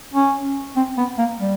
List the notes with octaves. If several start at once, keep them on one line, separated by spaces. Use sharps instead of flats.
C#4
C4
B3
A#3
G3